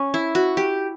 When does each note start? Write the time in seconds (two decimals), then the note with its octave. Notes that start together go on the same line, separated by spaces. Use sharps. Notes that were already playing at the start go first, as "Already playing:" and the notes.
Already playing: C#4
0.14 E4
0.35 F#4
0.57 G4